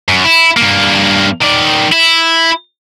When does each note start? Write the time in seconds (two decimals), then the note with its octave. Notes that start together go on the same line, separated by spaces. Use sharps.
0.08 F#2
0.24 E4
0.57 G2 A#3
1.42 D#3 D5
1.92 E4